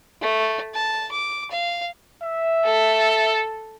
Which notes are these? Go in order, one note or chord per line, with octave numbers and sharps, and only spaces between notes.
A3
A5
D6
F5
E5
A4